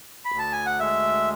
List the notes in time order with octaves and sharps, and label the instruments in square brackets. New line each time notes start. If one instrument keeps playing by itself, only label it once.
[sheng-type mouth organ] B5
[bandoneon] D2
[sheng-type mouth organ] A5
G#5
F#5
[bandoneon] G#3 [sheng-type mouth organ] E5